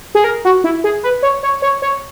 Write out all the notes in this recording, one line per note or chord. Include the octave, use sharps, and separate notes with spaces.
G#4
A#4
F#4
E4
G#4
B4
C#5
C#5
C#5
C#5